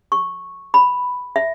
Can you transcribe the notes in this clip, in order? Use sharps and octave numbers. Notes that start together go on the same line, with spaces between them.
C#6
B5
E5